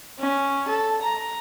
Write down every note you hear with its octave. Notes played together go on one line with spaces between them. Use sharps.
C#4
A4
A#5